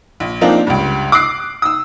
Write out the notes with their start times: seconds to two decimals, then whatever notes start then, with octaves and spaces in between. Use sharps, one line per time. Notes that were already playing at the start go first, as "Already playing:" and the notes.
0.20 A#1
0.41 F3 A#3 C4 D4 D#4 F4
0.67 C#2 G2
1.12 D6 D#6 F#6 C7
1.62 D#6 E6